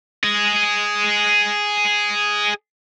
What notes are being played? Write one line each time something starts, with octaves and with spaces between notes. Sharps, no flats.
G#4 D#5